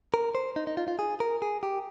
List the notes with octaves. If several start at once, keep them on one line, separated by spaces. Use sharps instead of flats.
A#4
C5
D#4
D#4
F4
F4
G#4
A#4
G#4
G4